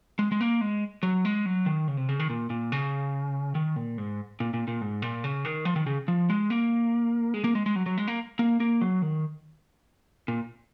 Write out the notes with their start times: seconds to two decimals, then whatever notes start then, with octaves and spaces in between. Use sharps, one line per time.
0.19 G#3
0.32 G#3
0.41 A#3
0.61 G#3
1.03 F#3
1.25 G#3
1.46 F#3
1.66 D#3
1.88 C#3
1.97 C3
2.09 C#3
2.19 D#3
2.30 A#2
2.50 A#2
2.72 C#3
3.55 D#3
3.76 A#2
3.98 G#2
4.40 A#2
4.54 A#2
4.68 A#2
4.81 G#2
5.02 A#2
5.24 C#3
5.45 D#3
5.65 F3
5.76 D#3
5.86 C#3
6.08 F3
6.30 G#3
6.50 A#3
7.34 G#3
7.44 A#3
7.55 G#3
7.66 G#3
7.76 F#3
7.86 F#3
7.98 G#3
8.08 A#3
8.39 A#3
8.60 A#3
8.81 F#3
9.02 D#3
10.28 A#2